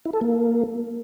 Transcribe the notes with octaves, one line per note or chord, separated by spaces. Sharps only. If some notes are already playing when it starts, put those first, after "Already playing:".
E4
A4
A#3